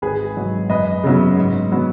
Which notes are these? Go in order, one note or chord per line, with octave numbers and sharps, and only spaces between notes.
G#1 G#4 B4
G#2 F#3
F#2 B4 D#5
C#3 F#3 B3
G#2
F#3 B3